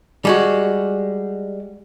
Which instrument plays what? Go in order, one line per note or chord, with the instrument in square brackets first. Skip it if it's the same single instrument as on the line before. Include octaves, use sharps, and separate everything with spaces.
[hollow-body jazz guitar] G3 G#3 F#4